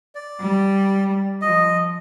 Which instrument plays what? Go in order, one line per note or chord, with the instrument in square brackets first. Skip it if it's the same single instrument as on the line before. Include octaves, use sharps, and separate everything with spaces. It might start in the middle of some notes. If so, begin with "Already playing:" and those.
[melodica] D5
[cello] G3
[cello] F3 [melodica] D#5